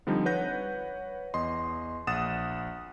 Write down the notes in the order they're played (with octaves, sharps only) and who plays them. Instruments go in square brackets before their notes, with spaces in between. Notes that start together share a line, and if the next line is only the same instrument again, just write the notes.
[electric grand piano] D3 F3 G3 C4 D#4
B4 C#5 F#5 G6 A#6
E2 D#5 C6
A#1 F#5 D#6 A6 E7